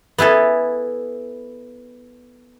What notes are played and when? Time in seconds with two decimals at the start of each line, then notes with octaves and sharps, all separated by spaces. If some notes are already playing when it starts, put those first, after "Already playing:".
0.18 B3 E4 G#4 A4